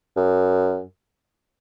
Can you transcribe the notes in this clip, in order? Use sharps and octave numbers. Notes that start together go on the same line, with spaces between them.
F#2